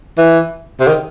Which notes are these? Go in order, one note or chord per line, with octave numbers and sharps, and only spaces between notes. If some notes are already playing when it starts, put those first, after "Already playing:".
E3
C3
D#3